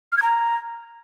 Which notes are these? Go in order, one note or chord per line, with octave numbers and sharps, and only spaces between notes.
F6
G#6
A#5